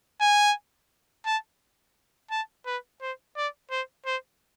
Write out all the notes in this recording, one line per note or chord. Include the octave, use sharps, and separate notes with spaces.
G#5
A5
A5
B4
C5
D5
C5
C5